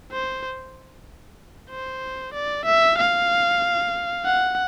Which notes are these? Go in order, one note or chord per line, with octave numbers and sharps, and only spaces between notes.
C5
C5
D5
E5
F5
F#5